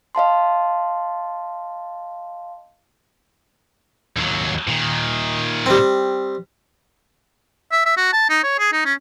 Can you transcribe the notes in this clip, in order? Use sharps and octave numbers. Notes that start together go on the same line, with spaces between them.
D#5 F5 A5 C6
D#2 F#3
A#2 D#3
G3 C4
E5
E5
F#4
A5
D#4
C#5
G#4
D#4
C#4